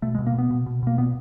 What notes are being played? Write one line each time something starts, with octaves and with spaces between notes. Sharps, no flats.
B2 A3
G#3
B2
A#3
B2 B3
B2
B2
B2 A#3
A#2 B3